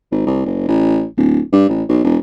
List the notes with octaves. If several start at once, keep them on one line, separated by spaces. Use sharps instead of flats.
G#1
C2
F#1
A1
D1
G2
A1
B1
E1